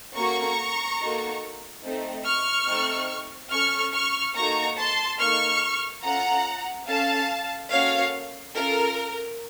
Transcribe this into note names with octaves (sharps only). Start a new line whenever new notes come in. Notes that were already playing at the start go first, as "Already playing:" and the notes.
A#3 C#4 F#4 A4 A#5 C#6
A#3 D#4 F#4 A4
A3 C4 D#4
C#6 F6
A3 C4 D#4 A4
C#4 A4 C#6 F6
C#6 F6
A#3 D#4 F#4 A4 A#5 C#6
A5 C6
A#3 D#4 A4 C#6 F6
C#4 F4 A4 F#5 A#5
C#4 A4 F5 A5
A#3 C#4 F#4 A4 C#5 F5
C#4 F4 A4 A#4